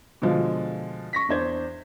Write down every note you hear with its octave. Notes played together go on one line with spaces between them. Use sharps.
B2 D3 F3 G#3 F4
C#6 A#6 B6
E2 D4 C5 G#6